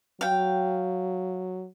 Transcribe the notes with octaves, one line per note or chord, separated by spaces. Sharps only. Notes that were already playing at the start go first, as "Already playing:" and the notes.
F#3 F5 G5